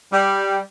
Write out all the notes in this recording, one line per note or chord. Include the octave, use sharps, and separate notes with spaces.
G3